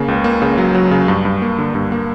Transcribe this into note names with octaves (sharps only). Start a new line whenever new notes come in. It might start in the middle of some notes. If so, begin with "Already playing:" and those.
Already playing: C#3 A#3
C#2
A#3
C#3
F#3
F#3
C#3
G2
G2
A#3
D3
G2
A#3